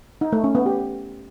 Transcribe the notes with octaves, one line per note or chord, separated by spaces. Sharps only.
D#4
A3
C#4
B3
G4